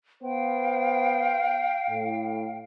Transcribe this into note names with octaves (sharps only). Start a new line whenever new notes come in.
B3 C5 F5 G5
A2